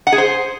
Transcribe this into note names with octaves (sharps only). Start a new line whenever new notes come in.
F#5
G#4
C5